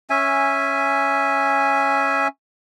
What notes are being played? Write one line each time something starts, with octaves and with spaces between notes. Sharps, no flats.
C#4 E5 G#5